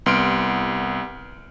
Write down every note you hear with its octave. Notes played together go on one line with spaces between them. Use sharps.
C2 B3 C6 F6 D7